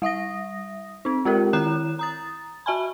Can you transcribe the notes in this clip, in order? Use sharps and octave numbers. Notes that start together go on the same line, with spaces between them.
G3 E5 D#6 A#6
C4 D#4
G#3 C4 F4 G4 A#4
D#3 E4 A#5 F#6 E7
A#5 D#6 A6
F#4 E5 G#5 A5 B5